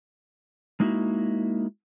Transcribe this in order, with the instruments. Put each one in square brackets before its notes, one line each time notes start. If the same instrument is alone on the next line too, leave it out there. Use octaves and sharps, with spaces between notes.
[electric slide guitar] G#3 A#3 D#4 E4 F#4